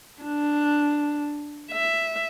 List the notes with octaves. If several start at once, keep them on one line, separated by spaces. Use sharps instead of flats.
D4
E5